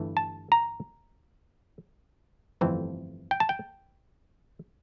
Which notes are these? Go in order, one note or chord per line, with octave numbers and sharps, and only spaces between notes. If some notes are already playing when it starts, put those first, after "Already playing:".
Already playing: G1 G2 E3 A3
A5
A#5
G1 F2 E3 A3 C4
G5
A5
G5